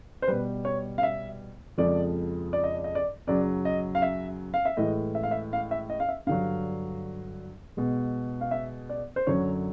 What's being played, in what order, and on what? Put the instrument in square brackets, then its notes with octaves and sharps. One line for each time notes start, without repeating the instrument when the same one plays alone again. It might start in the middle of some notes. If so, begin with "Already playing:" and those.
[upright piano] C5
B2 G3 B4
C#5
F5
E5
F2 C#3 F3 G#3 D5
D5
D#5
D5
D#5
D5
F#2 C#3 F#3 D5
D#5
F5
E5
F5
E5
A2 E3 G#3 D#5
E5
F5
E5
F5
E5
D#5
F5
E5
G2 D3 F#3 F5
B2 G#3
F5
E5
D5
C5
F#2 D3 F#3 C#5